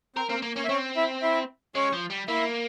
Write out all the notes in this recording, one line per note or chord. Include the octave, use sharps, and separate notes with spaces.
C4 A#4 C5
A#3 C4 A#4
A#3
A#3 C#4 C#5
E5
C4 C#4 C#5
E4 E5
E4 E5
G#3 C#4 C#5
F3
G3
A#3 E4 E5